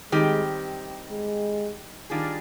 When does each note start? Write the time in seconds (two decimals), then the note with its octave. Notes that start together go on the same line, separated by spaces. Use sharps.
0.12 D#3 G3 G#3 C4 G4
1.11 G#3
2.10 D#3 G3 D4 F4 G#4